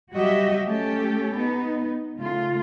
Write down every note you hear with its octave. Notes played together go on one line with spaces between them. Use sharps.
F#3 G3 F#4 G4 D#5 E5
A3 C#4 G4 A4
B3 D#4
C#3 A3 F4